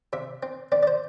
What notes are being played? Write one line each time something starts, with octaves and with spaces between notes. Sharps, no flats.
C3 E5
C4
C4 D5
D5
C5